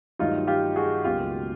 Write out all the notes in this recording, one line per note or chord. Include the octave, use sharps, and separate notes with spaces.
G2 D#3 F#3 A3 D#4 F4
F4 G4
F#4 G#4
C#2 B2 F#3 A#3 F4 G4